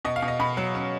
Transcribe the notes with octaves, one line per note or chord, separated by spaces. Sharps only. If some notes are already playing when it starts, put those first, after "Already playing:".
B2 D#5
F5
B2
D#5
B2 B5
F#3
C#4